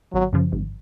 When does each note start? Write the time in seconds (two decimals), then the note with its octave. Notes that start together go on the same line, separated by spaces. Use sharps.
0.13 G#1 F#3
0.33 F#2 C#3 F3
0.52 G#1